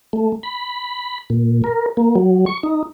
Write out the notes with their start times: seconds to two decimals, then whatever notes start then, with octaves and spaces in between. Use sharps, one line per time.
0.13 A3
0.43 B5
1.30 A#2
1.64 A#4
1.97 A#3
2.15 F#3
2.46 C#6
2.63 D#4